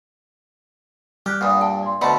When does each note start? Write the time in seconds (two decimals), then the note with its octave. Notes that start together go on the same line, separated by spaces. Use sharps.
1.26 G3 G4 F6 F#6
1.41 G2 A#2 F#5 B5 D#6
1.61 G5 A5
1.83 D5 C6
2.01 D2 B2 A3 E5 A5 B5 C6 C#7